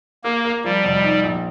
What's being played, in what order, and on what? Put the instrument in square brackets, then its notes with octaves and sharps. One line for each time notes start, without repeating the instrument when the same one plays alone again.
[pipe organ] A#3 [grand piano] A#4
[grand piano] A#4
[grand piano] F3 [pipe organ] G3
[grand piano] F1
D#4
A#1